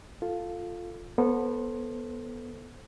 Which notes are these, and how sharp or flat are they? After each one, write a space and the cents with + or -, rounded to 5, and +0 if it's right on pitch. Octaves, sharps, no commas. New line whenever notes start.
F4 +5 A4 +0
B3 -15 A4 +0 C5 +15